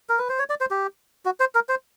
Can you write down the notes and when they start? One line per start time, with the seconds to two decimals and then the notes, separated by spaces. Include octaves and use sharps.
0.09 A#4
0.18 B4
0.29 C5
0.39 C#5
0.50 D5
0.61 C5
0.71 G4
1.25 F#4
1.40 C5
1.55 A#4
1.69 C5